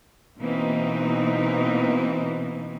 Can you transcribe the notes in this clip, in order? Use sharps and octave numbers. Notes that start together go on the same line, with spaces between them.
B2 E3 A#3 C4 D#4